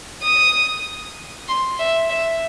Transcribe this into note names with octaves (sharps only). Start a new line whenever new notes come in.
D#6
C6
E5
E5